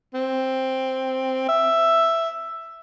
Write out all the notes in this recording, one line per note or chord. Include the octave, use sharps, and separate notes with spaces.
C4
E5